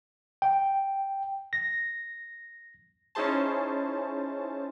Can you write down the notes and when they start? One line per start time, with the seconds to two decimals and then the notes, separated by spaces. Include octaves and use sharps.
0.42 G5
1.53 A#6
3.15 C#4 D#4 E4 G#4 C5 A5